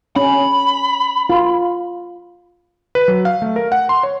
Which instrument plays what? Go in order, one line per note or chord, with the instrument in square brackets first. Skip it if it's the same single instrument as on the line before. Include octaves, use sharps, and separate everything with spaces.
[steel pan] C#4 [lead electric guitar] B5
[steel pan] F4
[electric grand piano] B4
F#3
F5
A3
A#4
F#5
C6
C#5